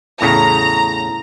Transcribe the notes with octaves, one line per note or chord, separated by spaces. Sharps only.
E2 A2 C#3 A#5